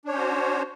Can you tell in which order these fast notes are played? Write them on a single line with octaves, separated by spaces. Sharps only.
D4 C#5 C#4 C5 F#4